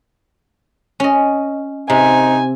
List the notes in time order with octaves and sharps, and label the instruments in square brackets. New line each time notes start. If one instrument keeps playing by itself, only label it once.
[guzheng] C#4 D#5
[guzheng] C3 [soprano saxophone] D#4 [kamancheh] G#5